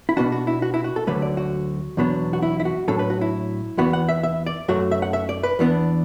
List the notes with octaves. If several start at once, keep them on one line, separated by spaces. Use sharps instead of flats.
E4
B2 B3 D4 F#4
F#4
E4
F#4
E4
F#4
A4
D2 D3 F#3 A3 B4
D5
F#4
E2 B2 F#3 B3 D4
F#4
E4
E4
F#4
A2 F#3 D4 A4
B4
F#4
E4
E2 E3 B3 F#4
F#5
E5
E5
D5
F#2 F#3 A3 F#4
E5
F#5
E5
D5
B4
E2 E3 B3 D4